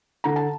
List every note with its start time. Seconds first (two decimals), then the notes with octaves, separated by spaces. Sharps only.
0.24 D3 A#5
0.36 A5